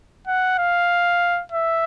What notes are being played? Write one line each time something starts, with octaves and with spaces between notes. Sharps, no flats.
F#5
F5
E5